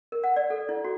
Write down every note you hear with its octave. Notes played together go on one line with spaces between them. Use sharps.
A#4
F#5
D5
A4
E4
F#4